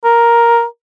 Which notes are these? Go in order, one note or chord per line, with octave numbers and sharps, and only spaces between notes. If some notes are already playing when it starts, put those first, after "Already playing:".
A#4